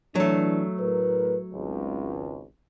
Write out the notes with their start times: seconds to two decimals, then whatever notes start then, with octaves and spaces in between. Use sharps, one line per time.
0.15 E3 F#3 A3 D4
0.80 A2 A#4 B4
1.54 G#1 C#2